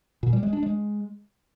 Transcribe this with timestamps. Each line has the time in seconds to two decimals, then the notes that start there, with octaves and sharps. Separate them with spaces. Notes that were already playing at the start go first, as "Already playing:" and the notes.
0.23 A#2
0.33 G3
0.43 G#3
0.53 D4
0.63 G#3